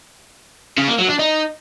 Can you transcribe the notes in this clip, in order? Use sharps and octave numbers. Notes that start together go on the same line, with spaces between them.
C#3
A#3
F#3
D4
D#4